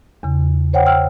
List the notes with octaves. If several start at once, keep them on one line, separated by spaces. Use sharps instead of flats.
E2 C#3
C5 C#5 F#5 G5
G5 E6 F6